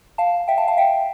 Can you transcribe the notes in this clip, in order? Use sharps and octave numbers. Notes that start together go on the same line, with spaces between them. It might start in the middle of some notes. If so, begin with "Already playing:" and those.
F5 A5
E5 G5
F5 A5
F5 A5
E5 G5